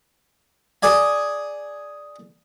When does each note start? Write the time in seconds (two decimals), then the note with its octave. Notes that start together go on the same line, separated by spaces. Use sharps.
0.83 G#4 D5 G#5